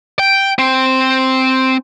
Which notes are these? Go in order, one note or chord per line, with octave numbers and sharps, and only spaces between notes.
G5
C4